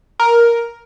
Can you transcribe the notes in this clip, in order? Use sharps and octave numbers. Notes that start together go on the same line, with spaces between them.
A#4